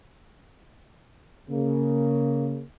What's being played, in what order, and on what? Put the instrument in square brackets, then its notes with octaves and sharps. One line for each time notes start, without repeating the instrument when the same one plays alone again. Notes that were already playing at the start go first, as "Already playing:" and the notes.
[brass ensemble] C#3 A#3